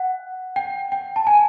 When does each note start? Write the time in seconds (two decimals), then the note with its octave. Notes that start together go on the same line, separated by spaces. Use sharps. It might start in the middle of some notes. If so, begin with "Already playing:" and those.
Already playing: F#5
0.56 G5
0.92 G5
1.16 A5
1.27 G#5